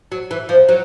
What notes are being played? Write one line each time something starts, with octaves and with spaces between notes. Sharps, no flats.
F#3
E3
F3
F#3